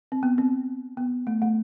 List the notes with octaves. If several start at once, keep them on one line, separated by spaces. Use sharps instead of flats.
C4
B3
C4
B3
A3
A3